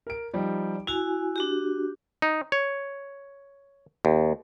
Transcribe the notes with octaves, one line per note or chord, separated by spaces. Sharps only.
A#4 D7
F3 G3 D#4
E4 F#4 G#5 F7
D4 F#4 G4
D#4
C#5
D#2